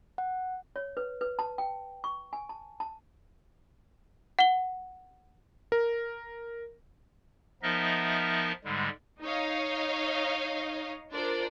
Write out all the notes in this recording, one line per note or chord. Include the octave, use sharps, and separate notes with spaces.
F#5
C#5
B4
B4
A5
G5
C#6
G#5
A5
A5
F#5 G7
A#4
F3 B3 D#4 A#4 D#5 E5
G#2 D3 G3 G#3
D#4 C#5 D#5 F5
D4 F4 A#4 C5 D5